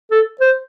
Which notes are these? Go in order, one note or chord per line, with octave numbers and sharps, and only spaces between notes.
A4
C5